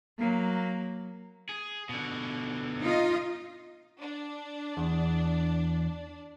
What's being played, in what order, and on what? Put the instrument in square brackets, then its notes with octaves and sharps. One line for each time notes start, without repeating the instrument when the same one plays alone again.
[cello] F#3 A#3
[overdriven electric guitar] G#4
B2 D3
[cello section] D#4 F4 D#5
[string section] D4 D5
[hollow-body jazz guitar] E2